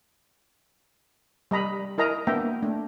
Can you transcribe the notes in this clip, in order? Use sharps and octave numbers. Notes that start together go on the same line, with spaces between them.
G3 D#5 A#5 B5
E4 A#4 D#5 A#5
A#3 B3 D4 E5 G5 A#5
A3 D4